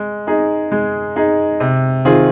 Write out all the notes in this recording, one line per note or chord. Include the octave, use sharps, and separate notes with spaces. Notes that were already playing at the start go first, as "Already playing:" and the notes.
Already playing: G#3
D#4 G#4
G#3
D#4 G#4
C3
D#3 C4 F4 G#4